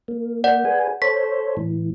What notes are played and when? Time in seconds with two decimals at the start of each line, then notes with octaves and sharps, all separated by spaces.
0.08 A#3
0.44 D5 F#5
0.65 G#4 B4 G#5
1.02 A4 C5 C#5 B6
1.57 A2 E3